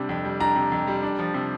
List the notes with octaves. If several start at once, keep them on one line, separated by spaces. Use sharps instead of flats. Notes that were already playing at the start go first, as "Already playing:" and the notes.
Already playing: C3 G3 D4
F2
G3
D4 A#5
C3
F2
G3
D4
F3
C3